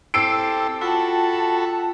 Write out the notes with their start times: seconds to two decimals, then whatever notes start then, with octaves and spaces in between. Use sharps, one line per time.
0.14 C4 E4 G4 A4 E6 C7 D7
0.81 F4 F#4 A4 G5 A5 B5